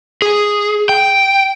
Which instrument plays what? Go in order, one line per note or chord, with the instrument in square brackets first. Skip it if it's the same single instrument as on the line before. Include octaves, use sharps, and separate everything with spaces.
[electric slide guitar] G#4
G5